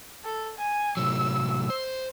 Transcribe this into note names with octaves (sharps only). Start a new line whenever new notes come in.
A4
G#5
A2 C3 F#3 E6
C5